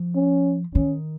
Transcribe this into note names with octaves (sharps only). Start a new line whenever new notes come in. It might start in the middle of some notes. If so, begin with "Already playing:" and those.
Already playing: F3
C#4
D#3 C#4